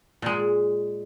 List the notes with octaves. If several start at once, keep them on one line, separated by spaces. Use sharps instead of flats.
A#2 G#3